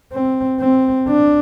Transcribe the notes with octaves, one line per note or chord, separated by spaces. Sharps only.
C4
C4
D4